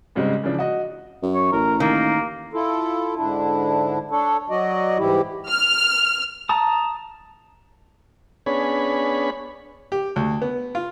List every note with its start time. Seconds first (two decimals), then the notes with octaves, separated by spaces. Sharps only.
0.15 G#2 C#3 G3 G#3 C4
0.43 C#3 E3 F3 D4
0.58 F#4 D#5
1.22 F#2
1.35 C#5
1.53 A1 A#4
1.80 D#3 A#3
2.53 E4 F4 A4
3.16 G#2 D3 D4 E4
4.11 D4 A4 C#5
4.50 F#3 F#4 D5 D#5
4.98 G#2 E3 G3 E4 G4
5.49 F6
6.49 A5 A#5 D#6
8.46 B3 C#4 D4 G#4 C#5 B5
9.92 G4
10.16 D2
10.42 B3
10.75 F4